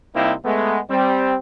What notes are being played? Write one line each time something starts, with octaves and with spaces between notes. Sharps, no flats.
C3 G3 A#3 C4 D#4 E4
G#3 A3 B3
G3 C4